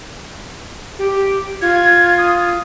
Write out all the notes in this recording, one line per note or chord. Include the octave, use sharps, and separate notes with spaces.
G4
F4 G#6
D#6